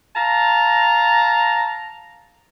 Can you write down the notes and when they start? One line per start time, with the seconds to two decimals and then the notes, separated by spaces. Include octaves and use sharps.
0.16 F5 A5 A#5